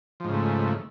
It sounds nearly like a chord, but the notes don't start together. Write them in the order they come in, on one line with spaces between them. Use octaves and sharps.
F3 G#2 C#3 A3